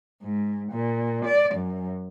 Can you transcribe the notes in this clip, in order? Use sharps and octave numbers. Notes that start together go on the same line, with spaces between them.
G#2
A#2
D5
F#2